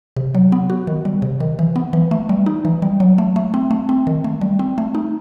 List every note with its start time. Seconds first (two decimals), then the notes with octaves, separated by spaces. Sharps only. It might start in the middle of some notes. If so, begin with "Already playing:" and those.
0.17 C3
0.35 F#3
0.52 B3
0.70 F#4
0.87 D#3
1.05 G3
1.22 C3
1.40 D#3
1.59 E3
1.76 B3
1.93 E3
2.11 A3
2.29 G3
2.46 D#4
2.65 E3
2.82 G3
3.00 F#3
3.18 A3
3.36 A3
3.54 C4
3.71 A3
3.89 C4
4.07 D#3
4.24 A3
4.41 G3
4.59 C4
4.78 A3
4.95 D#4